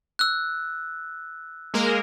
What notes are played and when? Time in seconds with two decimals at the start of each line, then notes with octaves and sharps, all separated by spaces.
0.19 E6 F#6
1.74 G#3 A#3 A#4